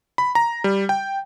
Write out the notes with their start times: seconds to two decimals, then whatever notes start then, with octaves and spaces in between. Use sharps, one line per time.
0.18 B5
0.35 A#5
0.64 G3
0.89 G5